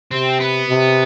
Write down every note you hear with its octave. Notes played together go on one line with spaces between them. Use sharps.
C3 C4
B3
C3